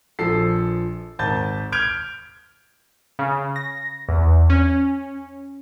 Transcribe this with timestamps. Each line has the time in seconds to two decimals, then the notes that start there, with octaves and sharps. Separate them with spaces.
0.19 A#1 F3 A4 C7
1.19 G#1 A5 G6 A6
1.72 F6 G6 G#6 D7 F7
3.19 C#3
3.56 A#6
4.09 E2
4.50 C#4